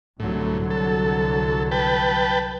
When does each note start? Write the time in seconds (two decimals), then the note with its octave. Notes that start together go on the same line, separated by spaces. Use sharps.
0.20 C2 A2 D3 F#3
0.71 A4
1.72 B4 G5 A5